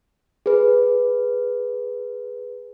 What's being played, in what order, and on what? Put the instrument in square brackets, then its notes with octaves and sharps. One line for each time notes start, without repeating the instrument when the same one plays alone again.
[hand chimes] G#4 B4